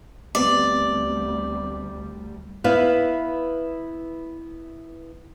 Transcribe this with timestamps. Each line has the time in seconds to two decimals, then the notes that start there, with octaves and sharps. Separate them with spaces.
0.35 D2 G3 B3 C4 D5
2.64 B3 E4 B4 E5 F5